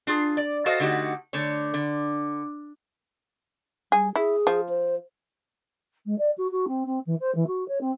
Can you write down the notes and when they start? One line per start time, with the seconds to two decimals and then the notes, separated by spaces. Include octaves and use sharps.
0.07 D4 F4 G#4
0.37 D5
0.66 F#4 A4 C5 D#5 F5 A5
0.80 D3 A3 D#4 F#4 G4
1.33 D3 A3 C#5
1.74 D3
3.92 G3 G#4
4.16 E4 G#4
4.47 F3
4.69 C5
6.05 G#3
6.18 D5
6.37 F#4
6.51 F#4
6.67 C4
6.86 C4
7.06 E3
7.20 C5
7.35 E3
7.47 F#4
7.68 C#5
7.81 C4